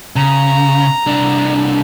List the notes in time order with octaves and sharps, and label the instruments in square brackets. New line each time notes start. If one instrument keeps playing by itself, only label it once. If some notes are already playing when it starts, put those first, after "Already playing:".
[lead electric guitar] C#3 [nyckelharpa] A#5
[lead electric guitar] C2 D4